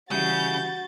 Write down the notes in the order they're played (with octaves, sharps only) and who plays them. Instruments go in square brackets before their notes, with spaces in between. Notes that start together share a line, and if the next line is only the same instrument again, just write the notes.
[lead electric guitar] C#3 [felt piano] E3 G3 [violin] F#4 A6 [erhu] G6